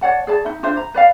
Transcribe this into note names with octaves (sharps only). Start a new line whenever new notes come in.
C#5 D5 F#5 A5
G#4 D5 A5
D#4 E5
D4 F4 C5 E5
A#5
B4 D5 F5